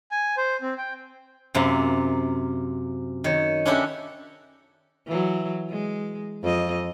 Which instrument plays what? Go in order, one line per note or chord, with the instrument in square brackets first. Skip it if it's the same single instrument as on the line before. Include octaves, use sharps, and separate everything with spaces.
[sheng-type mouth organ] G#5
C5
C4
G5
[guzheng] F#2 C3 A#3 F4
D#3 C#5
C#4 D4 E4 F#4 G4 A4
[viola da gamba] E3 F#3
G#3
F2 D#5